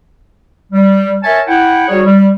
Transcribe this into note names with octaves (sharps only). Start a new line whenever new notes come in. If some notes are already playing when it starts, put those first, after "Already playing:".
G3
A#4 C#5 E5 G#5 A5
E4 F#5 G5
G3 D#4 F#4 G#4 C#5
G3